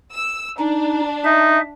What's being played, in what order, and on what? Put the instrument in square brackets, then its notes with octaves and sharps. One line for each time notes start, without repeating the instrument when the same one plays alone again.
[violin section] E6
[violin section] D4 [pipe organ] D#4
[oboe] D#4 [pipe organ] E5